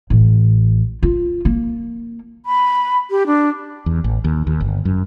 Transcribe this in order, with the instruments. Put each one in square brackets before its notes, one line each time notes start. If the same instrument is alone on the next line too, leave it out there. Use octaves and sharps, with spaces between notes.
[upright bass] A1
F4
A#3
[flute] B5
G4
D4
[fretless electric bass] E2
A1
D#2
D#2
G1
F#2